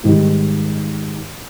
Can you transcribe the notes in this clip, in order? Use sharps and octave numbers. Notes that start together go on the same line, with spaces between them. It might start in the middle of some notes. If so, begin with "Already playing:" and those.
G#2 D#3 G3